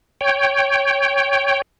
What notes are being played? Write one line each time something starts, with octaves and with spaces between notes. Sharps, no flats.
C#5 G5